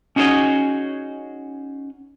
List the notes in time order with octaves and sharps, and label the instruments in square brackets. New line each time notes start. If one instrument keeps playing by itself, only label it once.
[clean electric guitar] C#4 D#4 F#4 G#4 C#5 D#5